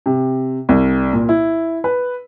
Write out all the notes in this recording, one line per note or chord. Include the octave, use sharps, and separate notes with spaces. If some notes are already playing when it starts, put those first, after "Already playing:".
C3
C2
A#2
E4
B4